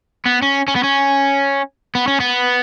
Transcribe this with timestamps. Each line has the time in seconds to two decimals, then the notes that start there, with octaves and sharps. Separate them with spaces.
0.26 B3
0.43 C#4
0.68 C#4
0.76 B3
0.83 C#4
1.95 B3
2.08 C#4
2.20 B3